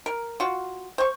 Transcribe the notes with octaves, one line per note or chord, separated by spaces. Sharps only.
A#4
F4 F#4
C5 C#6